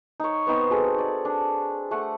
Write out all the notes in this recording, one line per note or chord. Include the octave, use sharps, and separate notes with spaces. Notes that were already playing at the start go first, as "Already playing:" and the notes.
D#4 C#5
B3 C4 D#4
F#4 G#4 A4 C5
D5
D4
A3 F#5